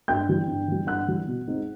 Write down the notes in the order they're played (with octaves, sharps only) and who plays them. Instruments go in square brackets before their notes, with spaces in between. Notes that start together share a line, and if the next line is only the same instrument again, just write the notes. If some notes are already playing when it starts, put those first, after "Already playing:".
[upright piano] G2 G5 G6
E3 G3
G2
E3 G3
G2 F#5 F#6
E3 G3
B2
G#3 C4 D#4